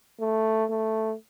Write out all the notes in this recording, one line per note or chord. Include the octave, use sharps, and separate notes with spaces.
A3
A3